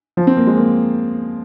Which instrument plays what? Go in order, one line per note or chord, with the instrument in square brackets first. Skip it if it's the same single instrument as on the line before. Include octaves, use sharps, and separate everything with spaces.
[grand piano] F3
C4
A#3
G#3
A#3